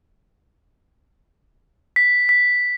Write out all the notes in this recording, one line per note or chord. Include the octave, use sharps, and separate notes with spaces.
B6
B6